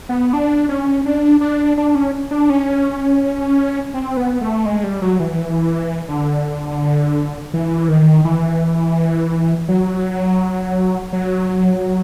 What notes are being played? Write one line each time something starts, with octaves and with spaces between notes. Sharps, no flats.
B3
D4
C#4
D4
D4
D4
C#4
D4
C#4
C4
B3
A3
G#3
G3
F#3
E3
D3
E3
D#3
E3
F#3
F#3